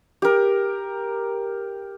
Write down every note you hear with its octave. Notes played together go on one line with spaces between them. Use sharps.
G4 A#4